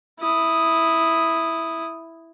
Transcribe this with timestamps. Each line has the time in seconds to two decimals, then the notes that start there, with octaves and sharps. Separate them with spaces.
0.20 E4 D#6